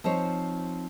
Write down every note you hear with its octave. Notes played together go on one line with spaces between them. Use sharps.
F3 C4 D#4 C5 C#5